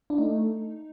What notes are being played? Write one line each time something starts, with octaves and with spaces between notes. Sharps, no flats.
D4
A3 D#4